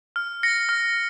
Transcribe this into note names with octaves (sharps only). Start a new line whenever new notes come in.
F6
A#6 C#7
F6